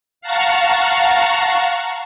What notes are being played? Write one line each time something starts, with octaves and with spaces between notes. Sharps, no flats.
F5 F#5 A5 A#5 C#6